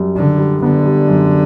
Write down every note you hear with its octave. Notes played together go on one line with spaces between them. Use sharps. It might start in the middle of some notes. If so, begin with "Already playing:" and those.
Already playing: F#2 G3
D3 G3
G3
D3 B3
G3
F#2